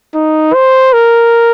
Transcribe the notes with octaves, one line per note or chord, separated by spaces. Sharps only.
D#4
C5
A#4